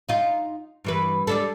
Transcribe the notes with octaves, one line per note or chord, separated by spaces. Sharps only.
D#4 F4
G2 E3 B4
G3 D4 A4